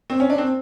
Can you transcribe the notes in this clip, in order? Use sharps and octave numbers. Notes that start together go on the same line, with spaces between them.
C4
C#4
D4
C4